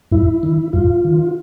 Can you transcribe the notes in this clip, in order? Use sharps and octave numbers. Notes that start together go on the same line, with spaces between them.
G2 E4
D#3
G2 F4
D#3